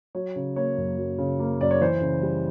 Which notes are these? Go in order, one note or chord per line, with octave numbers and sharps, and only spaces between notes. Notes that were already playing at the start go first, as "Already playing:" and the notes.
F#3 C#5
C#3
A#3 C#5
F#2
F#3
C#3
A#3
F#2 D5
C#5
E3 C5
C#3
G3